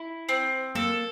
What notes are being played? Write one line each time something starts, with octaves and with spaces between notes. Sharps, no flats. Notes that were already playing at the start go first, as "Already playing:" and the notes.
Already playing: E4
C4
A#3 A4